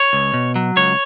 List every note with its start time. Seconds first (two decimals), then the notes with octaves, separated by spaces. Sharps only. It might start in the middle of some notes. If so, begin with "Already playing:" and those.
Already playing: C#5
0.13 C#2
0.34 B2
0.56 F#3
0.77 C#2 C#5